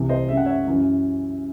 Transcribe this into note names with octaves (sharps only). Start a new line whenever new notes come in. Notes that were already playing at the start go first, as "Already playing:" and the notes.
Already playing: C2 C3 E3
C5 D#5
F#2 C#3 G#3 E5
F#5
C#5 E5
F#2 C#3 E3